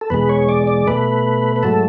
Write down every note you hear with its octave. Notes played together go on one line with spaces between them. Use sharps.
A4
E2 B2 G#3 B4
C#5
D5
D5
B2 A3 B4
B4
G#2 F#3 A3 A4